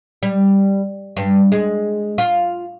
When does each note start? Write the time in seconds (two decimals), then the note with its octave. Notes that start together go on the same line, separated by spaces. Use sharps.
0.23 G3
1.17 G2
1.52 G#3
2.18 F4